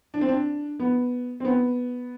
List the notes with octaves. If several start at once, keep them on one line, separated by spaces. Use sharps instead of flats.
D4
C4
D4
B3
C4
B3